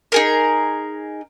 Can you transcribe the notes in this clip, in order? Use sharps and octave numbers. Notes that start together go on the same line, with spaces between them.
D#4 G#4 A#4